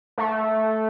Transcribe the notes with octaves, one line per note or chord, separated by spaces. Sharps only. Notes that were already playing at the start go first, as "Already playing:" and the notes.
A3